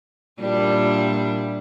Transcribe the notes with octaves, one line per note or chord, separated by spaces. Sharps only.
A#2 G3 D4 E4